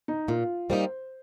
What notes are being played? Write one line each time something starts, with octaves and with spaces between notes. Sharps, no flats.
D#4
A#2 F4
G3 A#3 D#4 G4 C5